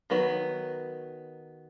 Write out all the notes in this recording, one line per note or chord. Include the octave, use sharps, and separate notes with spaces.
D#3 F#3 B3